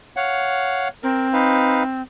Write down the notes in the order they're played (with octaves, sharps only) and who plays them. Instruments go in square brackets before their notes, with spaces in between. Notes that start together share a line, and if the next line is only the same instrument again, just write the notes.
[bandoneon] C#5 F5 F#5
[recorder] C4 [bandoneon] A#4
[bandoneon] D#4 B4 F5